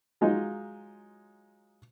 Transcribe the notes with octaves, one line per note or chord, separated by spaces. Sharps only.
F#3 G#3 D#4 F4